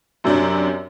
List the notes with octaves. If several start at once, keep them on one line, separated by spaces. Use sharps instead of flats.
F#2 C3 F#3 D4